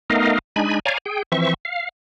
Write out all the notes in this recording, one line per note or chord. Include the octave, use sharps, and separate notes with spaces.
A3 B3 D#4 A#4 D#5 F5
G#3 D4 D#4 G#5 B5
C#5 D5 F5 G#5 A#5
G#4 G5
E3 F3 C4 E5 C#6
F5